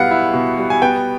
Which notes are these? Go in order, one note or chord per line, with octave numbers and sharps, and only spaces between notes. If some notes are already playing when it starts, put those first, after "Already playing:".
Already playing: B2 G3 B3 E4 F5 F#5
E4
B2
G3
G#5
B3 G5